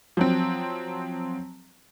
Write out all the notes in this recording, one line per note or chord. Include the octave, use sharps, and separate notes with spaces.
F3 F#3 C4